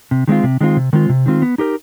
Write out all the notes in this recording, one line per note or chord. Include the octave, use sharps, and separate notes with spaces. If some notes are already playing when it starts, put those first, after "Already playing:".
C3
D#3 G#3 C4 F4
C3
D#3 G#3 C4 F4
C3
D#3 G#3 C4 F4
C3
D#3 G#3 C4 F4
B3
D#4 G4 A#4